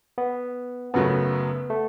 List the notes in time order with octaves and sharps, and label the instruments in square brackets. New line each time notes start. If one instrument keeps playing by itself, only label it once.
[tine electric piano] B3
[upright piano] F#2 C#3 F#3 A3 [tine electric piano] B3
[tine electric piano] A3